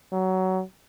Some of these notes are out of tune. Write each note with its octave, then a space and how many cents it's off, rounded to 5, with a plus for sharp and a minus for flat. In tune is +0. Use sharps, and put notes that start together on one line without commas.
F#3 +20